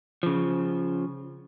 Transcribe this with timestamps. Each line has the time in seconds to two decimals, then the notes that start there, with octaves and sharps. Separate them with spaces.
0.23 C#3 F3